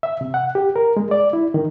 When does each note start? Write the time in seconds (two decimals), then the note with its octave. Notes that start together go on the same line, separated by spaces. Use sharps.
0.03 E5
0.21 C3
0.34 F#5
0.55 G4
0.76 A#4
0.97 G#3
1.11 D5
1.33 E4
1.54 D#3